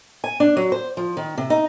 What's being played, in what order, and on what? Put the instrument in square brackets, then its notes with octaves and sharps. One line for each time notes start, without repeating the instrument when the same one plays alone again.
[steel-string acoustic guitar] G#5
D4
F#3
C5
F3
D#3
C3
D#4